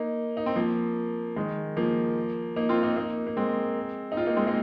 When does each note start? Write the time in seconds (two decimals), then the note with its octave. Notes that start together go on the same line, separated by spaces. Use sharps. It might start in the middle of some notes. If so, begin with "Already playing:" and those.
Already playing: A#3 D#4
0.37 D#4
0.46 C4
0.56 F3 A#3
1.36 D#3 G#3
1.77 F3 A#3
2.56 A#3 D#4
2.69 C4 F4
2.83 A#3 D#4
2.96 A#3 D#4
3.27 A#3
3.37 G#3 C4
4.12 D#4
4.17 C4 F4
4.26 A#3 D#4
4.37 G#3 C4
4.47 A#3 D#4